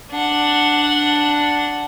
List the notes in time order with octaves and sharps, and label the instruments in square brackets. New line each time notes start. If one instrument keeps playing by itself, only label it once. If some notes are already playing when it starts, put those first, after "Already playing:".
[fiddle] D4 F#5